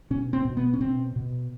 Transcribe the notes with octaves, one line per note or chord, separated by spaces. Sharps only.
B2 C#4
C4
B2
B3
C#4
B2 C4
B2